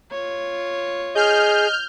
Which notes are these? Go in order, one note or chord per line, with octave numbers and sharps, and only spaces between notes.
F4 C#5
G#4 D#5 F6 G6